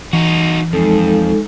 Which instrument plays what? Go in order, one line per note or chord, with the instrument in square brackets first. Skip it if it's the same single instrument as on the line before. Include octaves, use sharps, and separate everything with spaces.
[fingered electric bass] E3 [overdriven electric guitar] D#4 F#4
[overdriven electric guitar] F2 [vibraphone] G#3 D#4 A4